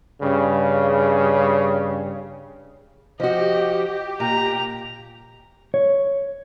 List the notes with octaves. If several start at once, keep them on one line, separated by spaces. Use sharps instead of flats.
G2 C#3
F3 F#4 G4 D#5
A#2 A#5
C#5